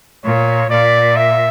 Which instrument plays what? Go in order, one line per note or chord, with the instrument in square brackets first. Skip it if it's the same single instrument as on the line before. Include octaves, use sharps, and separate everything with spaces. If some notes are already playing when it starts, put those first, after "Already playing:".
[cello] A#2 [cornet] C#5
[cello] A#2 [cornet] D5
[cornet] E5